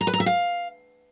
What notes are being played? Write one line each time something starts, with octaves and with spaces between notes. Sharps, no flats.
A#5
B4
A#5
E5
F5